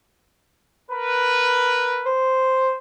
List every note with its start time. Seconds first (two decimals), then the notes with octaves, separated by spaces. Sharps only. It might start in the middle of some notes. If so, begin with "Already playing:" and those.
0.91 A#4 B4
2.06 C5